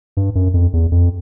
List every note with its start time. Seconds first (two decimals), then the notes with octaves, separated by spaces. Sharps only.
0.17 G2
0.35 F#2
0.54 F2
0.73 E2
0.92 F2